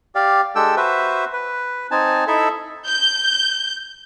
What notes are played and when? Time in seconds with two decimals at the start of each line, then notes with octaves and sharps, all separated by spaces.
0.15 G4 D5 F5
0.56 G#3 D4 G4 A4 G5 E6
0.77 F#4 B4 C5 E5
1.33 B4
1.91 C4 D#4 G#5 A5
2.27 D#4 E4 A4 E5
2.87 G6